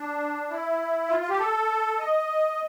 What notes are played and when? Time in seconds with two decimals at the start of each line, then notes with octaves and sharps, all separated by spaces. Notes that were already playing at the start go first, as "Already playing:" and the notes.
Already playing: D4
0.51 E4
1.09 F4
1.20 F4
1.30 G4
1.39 A4
1.99 D#5